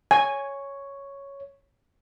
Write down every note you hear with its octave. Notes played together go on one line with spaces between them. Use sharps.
C#5 G#5